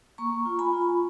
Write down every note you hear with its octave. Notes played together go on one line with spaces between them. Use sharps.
A#3 A#5 C#6
F4
G#5 B5
F4